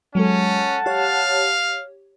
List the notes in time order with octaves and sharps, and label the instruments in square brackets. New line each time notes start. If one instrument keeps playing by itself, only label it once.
[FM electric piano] F#3 G#3 A4 [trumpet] C#4 [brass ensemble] F#5 A5
[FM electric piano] G4 C#5 [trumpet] F5